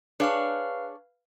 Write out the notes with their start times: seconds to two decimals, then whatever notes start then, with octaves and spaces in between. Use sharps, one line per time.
0.20 D4 G#4 B4 C#5 F5 F6